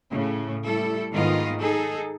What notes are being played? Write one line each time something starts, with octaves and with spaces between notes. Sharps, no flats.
A2 C#3
G3 A3 E4 A4
G#2 D#3 A#3 B3 F4 D#5
D#4 G#4 A4